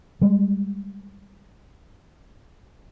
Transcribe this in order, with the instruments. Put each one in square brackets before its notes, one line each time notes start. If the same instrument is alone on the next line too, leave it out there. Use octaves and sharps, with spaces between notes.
[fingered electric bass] G3 G#3